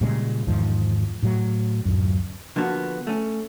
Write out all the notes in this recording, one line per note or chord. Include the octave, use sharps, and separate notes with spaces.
A#2 C#3 G3 G#3
E2 G#2 D#3 F3
A2 F#3
D1 F#2
D3 F3 A#3 B3 F#4
A3 C#4